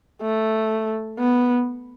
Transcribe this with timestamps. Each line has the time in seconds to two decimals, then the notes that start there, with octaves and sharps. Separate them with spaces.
0.22 A3
1.19 B3